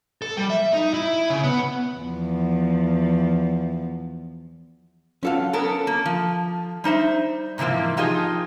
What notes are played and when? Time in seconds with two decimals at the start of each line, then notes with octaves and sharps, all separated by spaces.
0.22 A4
0.37 G3
0.50 E5
0.73 D#4
0.94 E4
1.30 C#3
1.44 B3
1.95 E2 F3
5.23 F#3 C#4 F4 A4 F5 F#5
5.53 B3 C#4 A4 A#4
5.87 A#3
6.06 F3
6.84 G3 D#4 C5 E5
7.58 G#2 C3 E3 F3 A#3
7.97 F3 D#4 F4 G4 G#4 D#5